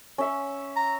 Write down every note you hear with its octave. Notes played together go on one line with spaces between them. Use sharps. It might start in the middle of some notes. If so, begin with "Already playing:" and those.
C#4 E5 C#6
A#5